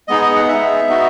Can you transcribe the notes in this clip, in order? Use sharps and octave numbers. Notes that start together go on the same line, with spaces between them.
G#3 B3 D#4 G#4 D#5
D#5
F#5
G#3 B3 D#4 G#4 E5
B3 D#4 F#4